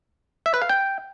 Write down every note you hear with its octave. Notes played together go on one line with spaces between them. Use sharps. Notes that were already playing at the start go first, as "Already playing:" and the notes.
E5
B4
F5
G5